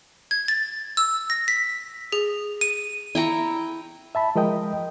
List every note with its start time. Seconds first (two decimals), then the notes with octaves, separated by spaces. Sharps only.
0.31 G#6
0.48 A6
0.97 E6
1.30 A#6
1.48 B6
2.12 G#4
2.61 D#7
3.15 E4 G5 A#5 C#6
4.15 E5 A5 B5
4.36 F3 G#3 A#4 D#5 G5 D#6